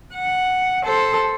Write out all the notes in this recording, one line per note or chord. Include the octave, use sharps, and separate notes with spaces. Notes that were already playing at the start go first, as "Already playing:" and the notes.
F#5
A4 C5